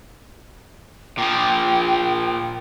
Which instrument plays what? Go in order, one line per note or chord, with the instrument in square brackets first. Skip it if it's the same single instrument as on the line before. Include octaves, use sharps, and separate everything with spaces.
[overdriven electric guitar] A#2 F3 [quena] G5